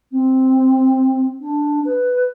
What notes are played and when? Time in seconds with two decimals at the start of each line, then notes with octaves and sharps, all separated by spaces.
0.12 C4
1.41 D4
1.85 B4